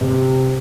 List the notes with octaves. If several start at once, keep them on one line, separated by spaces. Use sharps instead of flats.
C3